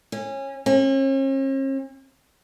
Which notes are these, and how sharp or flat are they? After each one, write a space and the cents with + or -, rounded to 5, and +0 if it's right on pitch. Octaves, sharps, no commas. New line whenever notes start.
C#4 -25
C#4 -45